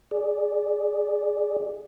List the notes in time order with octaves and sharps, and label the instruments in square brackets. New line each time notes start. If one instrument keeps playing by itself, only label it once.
[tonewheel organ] G#4 D5